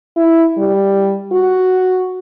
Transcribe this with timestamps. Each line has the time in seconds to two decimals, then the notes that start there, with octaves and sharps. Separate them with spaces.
0.16 E4
0.58 G3
1.32 F#4